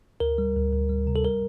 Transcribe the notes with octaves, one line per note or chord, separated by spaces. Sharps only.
D2 A#4
G3
D2
D2
G3
C3
A4
G3 A#4